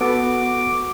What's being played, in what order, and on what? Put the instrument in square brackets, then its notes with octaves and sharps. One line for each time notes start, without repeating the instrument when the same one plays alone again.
[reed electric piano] B3 A4 [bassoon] F#4 [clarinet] D6